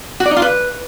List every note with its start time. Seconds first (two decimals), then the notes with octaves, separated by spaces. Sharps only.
0.20 F#4
0.26 D5
0.31 D#4
0.37 F4
0.42 B4